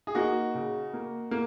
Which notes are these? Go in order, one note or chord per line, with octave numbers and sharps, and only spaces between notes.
G#4
A#3 D#4 F#4
C#3
A#3
A#3